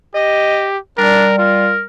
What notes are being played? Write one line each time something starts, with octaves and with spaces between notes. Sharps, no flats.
G4 D#5
G3 D4 A#4 D5
F4 A#4